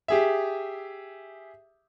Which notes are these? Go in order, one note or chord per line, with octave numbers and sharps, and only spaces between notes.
G4 G#4 E5